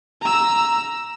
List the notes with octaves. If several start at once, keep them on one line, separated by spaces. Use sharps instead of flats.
A#5 E6